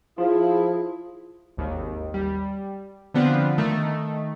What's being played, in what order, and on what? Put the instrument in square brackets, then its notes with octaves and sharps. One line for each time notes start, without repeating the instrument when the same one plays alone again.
[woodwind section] F3 [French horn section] E4 [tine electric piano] F4 [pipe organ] G#4
[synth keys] G#1 D#2 D#3
G3
D3 F3 B3 C4 D4 F4
D#3 A3 D#4